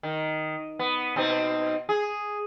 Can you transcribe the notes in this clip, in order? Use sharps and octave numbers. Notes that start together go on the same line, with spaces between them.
D#3
B3
B2 C4 D#4
G#4